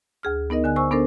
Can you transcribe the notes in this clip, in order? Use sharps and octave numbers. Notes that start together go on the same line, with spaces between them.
D2 G#4 F6
B3 D#4 A#4 D#5
D3 G#5 F#6
C5 G#5 C#6 E6
B3 D4 A4 A#4 C5